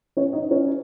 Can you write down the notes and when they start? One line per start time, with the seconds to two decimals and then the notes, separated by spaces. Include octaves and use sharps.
0.17 C#4 C#5
0.33 D#4 D#5
0.51 C#4 C#5